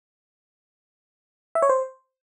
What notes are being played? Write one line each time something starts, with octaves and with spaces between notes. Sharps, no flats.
E5
C#5
C5